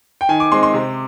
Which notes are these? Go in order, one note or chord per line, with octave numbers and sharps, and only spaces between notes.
G5
D#3 G#5
D6
G#3 C4 C6
C6
C3